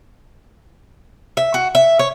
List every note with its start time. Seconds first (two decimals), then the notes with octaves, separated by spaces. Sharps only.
1.37 E5
1.54 F#4
1.75 E5
1.99 C#5